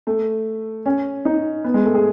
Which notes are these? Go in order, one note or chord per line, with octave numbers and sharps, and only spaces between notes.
A3
C#4
D#4
B3
G#3
A3
G#4